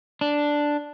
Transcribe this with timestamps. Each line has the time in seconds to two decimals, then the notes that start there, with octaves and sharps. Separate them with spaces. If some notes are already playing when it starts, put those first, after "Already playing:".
0.21 D4